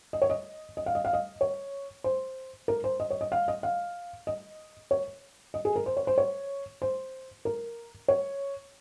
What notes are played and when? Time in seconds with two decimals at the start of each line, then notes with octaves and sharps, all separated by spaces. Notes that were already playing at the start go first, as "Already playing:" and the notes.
0.13 D#5
0.22 C#5
0.30 D#5
0.77 D#5
0.86 F5
0.95 D#5
1.05 F5
1.13 D#5
1.41 C#5
2.04 C5
2.68 A#4
2.84 C5
3.00 D#5
3.10 C#5
3.21 D#5
3.32 F5
3.48 D#5
3.63 F5
4.27 D#5
4.91 C#5
5.54 D#5
5.65 G#4
5.76 A#4
5.86 C5
5.97 C#5
6.07 C5
6.18 C#5
6.82 C5
7.45 A#4
8.08 C#5